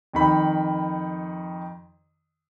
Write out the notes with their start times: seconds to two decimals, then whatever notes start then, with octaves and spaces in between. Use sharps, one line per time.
0.13 F2 D#3 B5